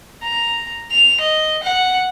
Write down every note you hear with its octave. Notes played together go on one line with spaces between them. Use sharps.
A#5
F7
D#5
F#5